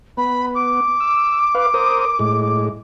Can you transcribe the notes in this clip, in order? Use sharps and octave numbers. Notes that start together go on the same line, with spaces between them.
B3 B5
D6
E6
B4 F5
A#4 C5 D#6
A2 G#3